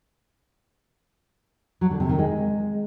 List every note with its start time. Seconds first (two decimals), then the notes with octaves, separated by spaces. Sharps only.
1.81 F#3
1.91 D3
2.00 C3
2.09 D#3
2.19 G#3